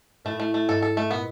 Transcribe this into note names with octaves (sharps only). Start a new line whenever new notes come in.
A2 A3
A3
A3
G#2 A4
A4
A3
A#2 B3